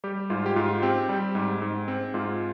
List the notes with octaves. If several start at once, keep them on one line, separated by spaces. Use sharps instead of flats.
G3 G4
G#2 F4
G4
G#2 F4
C4 G4
G3
G#2
G#2
C4
G#2 F4